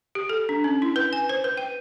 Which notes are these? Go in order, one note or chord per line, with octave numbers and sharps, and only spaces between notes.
G4
A4
D4
C#4
E4
B4
G#5
C5
B4
G5